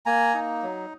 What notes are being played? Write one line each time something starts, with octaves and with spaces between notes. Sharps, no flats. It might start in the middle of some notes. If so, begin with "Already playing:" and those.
A#3 G#5 A#5
D#4
F#3